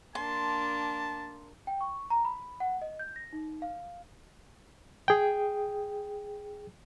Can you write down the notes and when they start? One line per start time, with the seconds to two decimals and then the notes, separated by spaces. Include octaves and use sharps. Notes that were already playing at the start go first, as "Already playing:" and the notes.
0.15 A#3 D4 A5 C6
1.67 G5
1.81 C#6
2.10 A#5
2.25 B5
2.60 F#5
2.82 D#5
2.99 G6
3.16 A#6
3.33 D#4
3.62 F5
5.08 G#4 G5